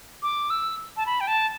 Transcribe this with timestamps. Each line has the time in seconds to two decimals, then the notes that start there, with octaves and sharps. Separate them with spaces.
0.23 D6
0.50 E6
0.97 A5
1.06 B5
1.20 G5
1.28 A5